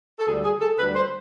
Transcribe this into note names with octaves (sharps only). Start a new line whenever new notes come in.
A4
D2 D3 G3 G#4
G#4
A4
D2 D3 G3 B4
C5